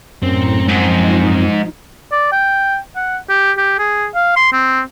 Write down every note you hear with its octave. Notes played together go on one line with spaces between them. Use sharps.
F#2 A2 C4 A#5 C#7
G#2 F3 C4 D#4
D5
G5
F#5
G4
G4
G#4
F5
C6
C4